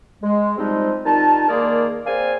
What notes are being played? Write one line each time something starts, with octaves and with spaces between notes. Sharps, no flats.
G#3
C3 F3 G3 G#3 C4 D#4
D#3 G3 D#4 F4 A5
D#3 G#3 A#3 G#4 A#4 D5
A#3 C4 G#4 D5 F5 G#5